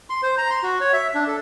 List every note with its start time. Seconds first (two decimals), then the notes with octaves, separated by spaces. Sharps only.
0.10 C6
0.23 C5
0.38 A#5
0.50 C6
0.63 F#4
0.81 C#5
0.93 E5
1.15 D4
1.28 A4